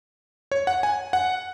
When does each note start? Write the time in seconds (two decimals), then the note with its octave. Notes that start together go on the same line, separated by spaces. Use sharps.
0.52 C#5
0.67 F#5
0.83 G#5
1.13 F#5